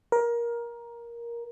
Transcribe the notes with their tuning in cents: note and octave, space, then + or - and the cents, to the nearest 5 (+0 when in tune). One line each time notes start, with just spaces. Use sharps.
A#4 +15